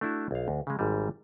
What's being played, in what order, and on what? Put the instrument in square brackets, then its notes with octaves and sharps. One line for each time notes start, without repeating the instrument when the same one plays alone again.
[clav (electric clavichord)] A3 D4 E4 F#4
B1 F5
D2
C#3 G#3
G#1 G#2 G3